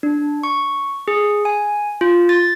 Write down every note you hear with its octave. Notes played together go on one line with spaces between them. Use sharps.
D4
C#6
G#4
G#5
F4
A6